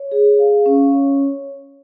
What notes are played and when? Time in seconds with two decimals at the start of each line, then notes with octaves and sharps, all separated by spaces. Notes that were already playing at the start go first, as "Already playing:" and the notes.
Already playing: C#5
0.12 G#4
0.39 F5
0.66 C#4
0.94 C#5